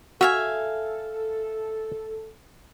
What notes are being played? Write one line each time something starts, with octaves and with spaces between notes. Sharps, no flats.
F#4 A4 E5 F5 G#5